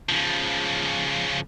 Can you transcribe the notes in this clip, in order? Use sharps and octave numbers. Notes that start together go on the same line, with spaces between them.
C#3 F3